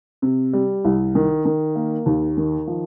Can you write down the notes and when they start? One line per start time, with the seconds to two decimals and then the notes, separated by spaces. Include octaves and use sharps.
0.22 C3
0.53 G3
0.85 C2
1.15 D#3
1.45 D#3
1.76 A#3
2.06 D#2
2.37 D#3
2.67 F3